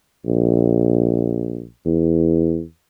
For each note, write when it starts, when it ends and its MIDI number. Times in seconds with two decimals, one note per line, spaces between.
0.25 1.64 34
1.85 2.62 40